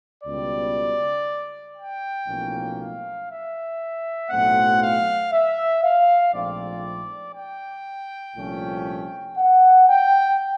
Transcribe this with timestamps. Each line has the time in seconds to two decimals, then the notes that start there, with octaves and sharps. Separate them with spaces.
0.24 C#2 B2 G3 D5
1.76 G5
2.27 B1 A2 F3 A#3 C#4
2.78 F5
3.28 E5
4.30 B1 A2 F#3 A3 C4 F#5
4.81 F5
5.32 E5
5.83 F5
6.33 A#1 G#2 F3 A3 C4 D5
7.35 G5
8.36 C2 A#2 F3 A3 C#4
9.38 F#5
9.89 G5